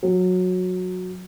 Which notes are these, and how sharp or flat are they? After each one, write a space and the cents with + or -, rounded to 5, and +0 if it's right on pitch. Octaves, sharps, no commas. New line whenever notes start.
F#3 -15